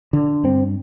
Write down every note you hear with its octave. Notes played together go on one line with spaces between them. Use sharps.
D3
G2 C4